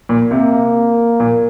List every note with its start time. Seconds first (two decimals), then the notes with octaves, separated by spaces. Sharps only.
0.09 A#2
0.31 C3 A#3
1.20 A#2